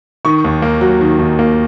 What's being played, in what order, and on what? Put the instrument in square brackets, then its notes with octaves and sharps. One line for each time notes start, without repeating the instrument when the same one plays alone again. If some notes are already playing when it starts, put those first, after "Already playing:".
[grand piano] D#3 C#6
D#2
A#3
F#3
D#3
D#2
A#3